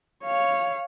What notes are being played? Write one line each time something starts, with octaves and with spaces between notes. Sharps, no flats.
C#5 F5